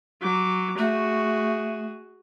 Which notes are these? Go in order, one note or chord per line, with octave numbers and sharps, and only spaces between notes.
F#3 D6
A3 F#4 G#4